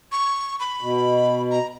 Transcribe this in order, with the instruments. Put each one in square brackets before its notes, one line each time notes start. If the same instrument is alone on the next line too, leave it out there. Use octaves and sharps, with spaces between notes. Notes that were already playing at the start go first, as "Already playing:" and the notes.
[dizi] C#6
B5
[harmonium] B2
[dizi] A#5